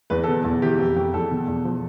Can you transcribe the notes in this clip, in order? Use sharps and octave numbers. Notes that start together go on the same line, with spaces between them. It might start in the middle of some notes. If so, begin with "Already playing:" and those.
E2 B4
A4
B2
E2
E3 G4
F2
F2
E2 A4
B2
E2
F3